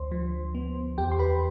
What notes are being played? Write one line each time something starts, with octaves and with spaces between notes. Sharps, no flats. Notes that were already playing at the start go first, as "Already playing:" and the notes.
Already playing: D2 D3 C5 C6
F3
B3
E2 G4 G5
C6
B4 B5